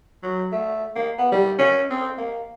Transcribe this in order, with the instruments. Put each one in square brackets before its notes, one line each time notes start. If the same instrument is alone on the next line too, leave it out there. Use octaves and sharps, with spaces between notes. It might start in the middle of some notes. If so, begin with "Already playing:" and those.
[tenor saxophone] F#3
A3
A#3
B3
G3
C#4
C4
A#3